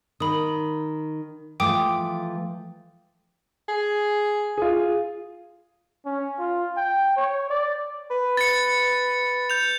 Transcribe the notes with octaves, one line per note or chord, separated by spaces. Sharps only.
D#3 B5 D#6
E3 F3 A3 G5 D6 D#6
G#4
F4 G#4
C#4
F4
G5
C#5
D5
B4
A6 C#7
G6 F7